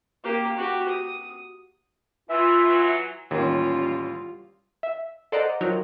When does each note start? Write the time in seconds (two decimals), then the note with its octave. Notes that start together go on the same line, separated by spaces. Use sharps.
0.24 A#3 G4
0.56 F#4 G4
0.88 D#6
2.29 E3 F4 E5
2.64 E3 F#3
3.31 A1 D#2 G3 C#4 F4
4.83 E5
5.32 A4 C5 D5 D#5 F#5 A#5
5.61 D#3 F3 F#3 A#4